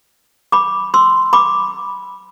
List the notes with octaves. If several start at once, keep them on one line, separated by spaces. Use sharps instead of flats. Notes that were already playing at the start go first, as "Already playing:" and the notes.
B5 D6
C6 E6
B5 D6